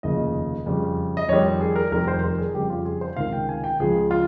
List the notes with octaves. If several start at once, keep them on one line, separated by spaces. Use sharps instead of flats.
F1 D#2 C#3 F3 D#5
F2 C#3 G3
D#5
F2 D#3 G3 C#5
G#4
A#4
F1 F2 D#3 G3 A#4
C5
A#4
G#4
F2 C#3 G3 G4
F4
G#4
C5
C#2 C3 D#3 F5
G5
G#5
G5
C#2 C#3 F3 G#4
F4